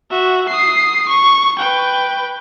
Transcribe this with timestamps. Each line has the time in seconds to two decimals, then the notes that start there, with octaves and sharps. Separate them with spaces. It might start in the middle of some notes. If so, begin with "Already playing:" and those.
0.10 F#4 E5
0.49 D#6 C7
1.08 C#6
1.58 B4 G5